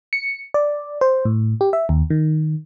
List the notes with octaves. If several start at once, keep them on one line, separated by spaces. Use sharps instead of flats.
C#7
D5
C5
A2
G4
E5
D#2
D#3